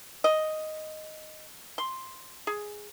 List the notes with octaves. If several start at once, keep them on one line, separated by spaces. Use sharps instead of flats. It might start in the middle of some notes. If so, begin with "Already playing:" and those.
D#5
C6
G#4